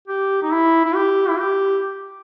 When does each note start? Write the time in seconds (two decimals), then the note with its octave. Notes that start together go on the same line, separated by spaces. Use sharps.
0.08 G4
0.42 D#4
0.52 E4
0.85 E4
0.95 G4
1.29 E4
1.39 G4